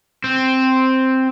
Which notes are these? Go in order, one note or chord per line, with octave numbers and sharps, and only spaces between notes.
C4